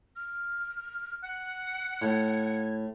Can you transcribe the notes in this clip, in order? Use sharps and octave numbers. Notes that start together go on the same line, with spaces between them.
F6
F#5 F#6
A2 G#6